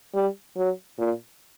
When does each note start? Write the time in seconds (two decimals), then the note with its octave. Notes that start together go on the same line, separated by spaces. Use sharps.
0.14 G3
0.56 F#3
0.98 A#2